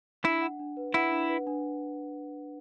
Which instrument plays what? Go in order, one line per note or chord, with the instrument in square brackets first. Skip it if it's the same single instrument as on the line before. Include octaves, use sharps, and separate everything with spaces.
[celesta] D4 [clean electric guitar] E4
[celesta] F#5
D4
B4
[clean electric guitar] E4 [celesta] F#5
[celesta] D4
B4
D4